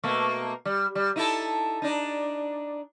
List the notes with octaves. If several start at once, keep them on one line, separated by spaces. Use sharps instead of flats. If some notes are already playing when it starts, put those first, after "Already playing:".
B2 A3 A#3
G3
G3
D#4 E4 A4
D4 D#4